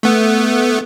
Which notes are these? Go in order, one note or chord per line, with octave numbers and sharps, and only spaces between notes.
A3 B3